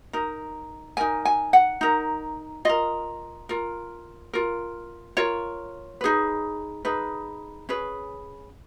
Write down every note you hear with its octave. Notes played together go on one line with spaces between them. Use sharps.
D#4 A#4
D#4 A#4 G#5
G#5
F#5
D#4 A#4
F4 A#4 D#5
F4 A#4
F4 A#4
F4 A#4 C#5
D#4 G#4 B4
D#4 G#4 B4
C#4 G#4 B4